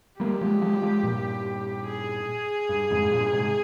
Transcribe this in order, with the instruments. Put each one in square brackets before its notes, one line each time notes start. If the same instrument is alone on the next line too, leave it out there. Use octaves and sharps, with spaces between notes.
[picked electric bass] G3 A#3 [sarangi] G4
[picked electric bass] F3 G#3
F3 G#3
G3
F3 G#3
G2 A#2
[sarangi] G#4
[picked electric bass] G2
F2 G#2
G2 A#2
G#2 C3